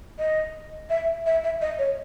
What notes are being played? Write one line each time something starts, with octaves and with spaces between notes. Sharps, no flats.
D#5
E5
E5
E5
D#5
C#5